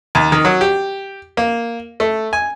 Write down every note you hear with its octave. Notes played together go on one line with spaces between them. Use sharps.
D#2
D#3
F#3
G4
A#3
A3
G#5